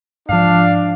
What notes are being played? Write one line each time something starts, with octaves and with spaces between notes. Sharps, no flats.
G#2 F3 D4 F5